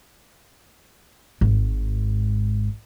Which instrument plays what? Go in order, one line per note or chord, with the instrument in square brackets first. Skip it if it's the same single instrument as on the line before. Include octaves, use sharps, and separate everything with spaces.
[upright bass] G#1 G#2